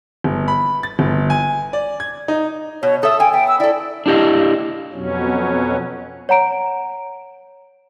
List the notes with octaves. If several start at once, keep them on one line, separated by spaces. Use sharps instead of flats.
G1
B5
A6
G1
G#5
D5
G#6
D#4
B2 C#5
A4 E5 D#6
G5 G#5
B3 G5
E6
E4 A4 D5
D4 E4 G4 D#5 F5
F2 B2 F#3 C#4
C#5 F#5 A#5 D7